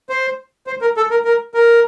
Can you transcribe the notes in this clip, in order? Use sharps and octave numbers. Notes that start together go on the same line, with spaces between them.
C5
C5
A#4
A4
A#4
A#4
A#4